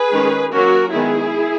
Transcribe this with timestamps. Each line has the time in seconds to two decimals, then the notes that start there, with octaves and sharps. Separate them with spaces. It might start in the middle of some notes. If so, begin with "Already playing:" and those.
Already playing: G#4 B4
0.12 D#3 G#3 C#4
0.52 F#3 A#3 C#4 F#4 A#4
0.92 D#3 G#3 B3 E4 G#4